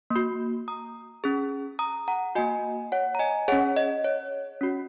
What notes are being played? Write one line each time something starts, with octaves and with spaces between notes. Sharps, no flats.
A#3
F#4
A#5 D#6
C#4 G#4
A#5 D#6
F#5 A#5
A#3 F#4 D#5 G#5
C#5 F#5
A#5
D#5 G#5
C#4 G#4 C#5 F#5
D#5
C#5
C#4 F#4